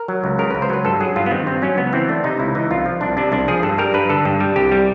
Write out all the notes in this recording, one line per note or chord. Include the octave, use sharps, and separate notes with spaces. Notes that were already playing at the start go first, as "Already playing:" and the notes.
Already playing: A#4
F#3
C#2
C#3 A#4
C#2 B4
C5
F#3 B4
G2 A4
F#3 G#4
G2 F4
B3
D#3 C4
G2 C4
F#3 C#4
C#2 B3
E3 C4
A3 D4
C3 D#4
C#2 E4
E3 D#4
C2 F4
F3
C2 D4
C3 D4
C2 D4
F3 G#4
G2 A4
G3 A#4
G2 B4
D3 A4
G2
G3
C2 G4
G3